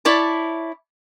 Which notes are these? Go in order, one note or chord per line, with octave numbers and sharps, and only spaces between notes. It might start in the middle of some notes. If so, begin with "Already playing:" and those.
E4 C#5 D5 A5